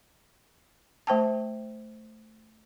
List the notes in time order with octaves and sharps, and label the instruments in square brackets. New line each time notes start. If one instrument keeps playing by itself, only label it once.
[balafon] A3 C5 G5 A5